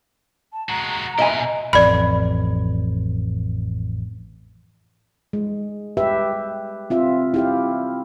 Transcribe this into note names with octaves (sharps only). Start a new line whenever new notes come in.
A5
G#3 F#4 A#5
B2 A#4 D#5 E5 G#5
A1 F2 D5 B5
G#3
G4 B4 E5
C4 F4 E5
E4 G4 F5